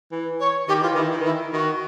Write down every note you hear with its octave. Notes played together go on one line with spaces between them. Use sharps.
E3
C#5
D#3 G4
E3 F4
D#3 E4
E3 D#4
D#3 E4
D#3 F#4